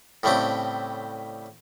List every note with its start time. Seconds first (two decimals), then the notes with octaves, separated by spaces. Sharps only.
0.23 A2 C#3 G3 A3 C4 G5